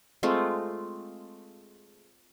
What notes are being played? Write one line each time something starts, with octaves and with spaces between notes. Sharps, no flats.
G#3 A3 C4 F4